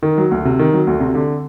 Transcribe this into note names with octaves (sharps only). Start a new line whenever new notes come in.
D#3
F#3
D2
C3
D#3
F#3
D2
C3
D3